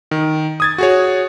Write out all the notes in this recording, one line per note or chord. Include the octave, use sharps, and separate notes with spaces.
D#3
D#6 G#6 A6
F#4 G#4 C#5